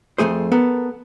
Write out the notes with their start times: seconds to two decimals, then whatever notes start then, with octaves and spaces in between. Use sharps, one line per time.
0.18 F2 C#3 A3 G#4 C5
0.52 B3 A4 A#4